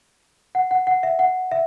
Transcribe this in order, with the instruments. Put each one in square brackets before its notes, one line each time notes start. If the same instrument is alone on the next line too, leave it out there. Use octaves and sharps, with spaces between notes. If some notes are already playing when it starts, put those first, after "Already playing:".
[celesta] F#5
F#5
F#5
E5
F#5
E5